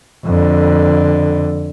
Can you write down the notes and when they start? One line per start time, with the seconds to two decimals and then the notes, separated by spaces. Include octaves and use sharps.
0.25 F2 D3